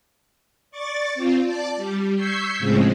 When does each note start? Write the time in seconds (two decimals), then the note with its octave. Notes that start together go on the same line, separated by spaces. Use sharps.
0.71 D5 C#6 D6 A6
1.15 C4 F4
1.45 D5 A5 D6
1.76 G3
2.15 C#6 E6 G6 G#6 B6 C7
2.59 A2 C#3 F3 G#3 C4